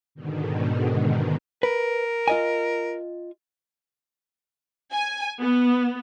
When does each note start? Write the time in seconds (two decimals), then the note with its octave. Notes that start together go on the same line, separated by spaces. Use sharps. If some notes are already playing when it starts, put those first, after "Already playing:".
0.15 G#2 B2 D3 D#3
1.63 A#4 B4
2.28 F4 D#5 G#5
4.94 G#5
5.41 B3